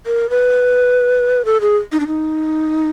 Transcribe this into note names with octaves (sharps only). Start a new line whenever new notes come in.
A#4
B4
A4
G#4
D#4
D4
D#4